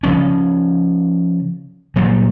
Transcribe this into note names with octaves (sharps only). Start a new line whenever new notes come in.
C#3 F3 C#4
A#2 F#3 G3